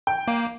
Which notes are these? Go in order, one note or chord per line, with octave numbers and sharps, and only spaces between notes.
G5
A#3